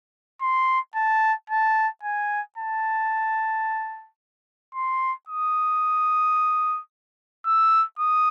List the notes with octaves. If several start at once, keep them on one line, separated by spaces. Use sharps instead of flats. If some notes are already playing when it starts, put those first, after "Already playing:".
C6
A5
A5
G#5
A5
C6
D#6
E6
D#6